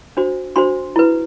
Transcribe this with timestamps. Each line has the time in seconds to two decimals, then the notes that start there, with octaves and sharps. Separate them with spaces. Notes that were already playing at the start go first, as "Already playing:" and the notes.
0.17 D4 F#4 C5
0.56 D4 F#4 C5 C6
0.96 E4 B4